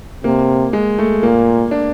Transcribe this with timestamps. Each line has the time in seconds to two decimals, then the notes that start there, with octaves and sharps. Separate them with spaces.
0.24 C3 A#3
0.73 G#3
0.98 A3
1.22 A#2 A#3
1.71 D4